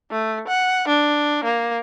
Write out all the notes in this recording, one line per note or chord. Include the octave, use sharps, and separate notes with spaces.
A3
F#5
D4
A#3